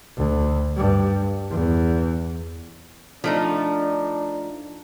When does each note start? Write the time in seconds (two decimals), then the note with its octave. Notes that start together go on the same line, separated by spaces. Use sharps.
0.17 D2
0.77 G2
1.50 E2
3.24 F3 A3 D4 D#4